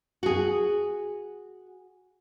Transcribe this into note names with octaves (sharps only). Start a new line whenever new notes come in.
F#4 G#4